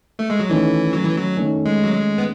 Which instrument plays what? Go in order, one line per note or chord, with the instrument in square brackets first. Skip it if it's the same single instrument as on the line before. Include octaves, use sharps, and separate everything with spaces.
[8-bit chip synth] A3
G#3
F#3
[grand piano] D#3 A3 C#4 [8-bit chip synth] E3
[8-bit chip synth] F#3
E3
F#3
[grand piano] D#3 A3 C#4
[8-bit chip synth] G#3
F#3
G#3
B3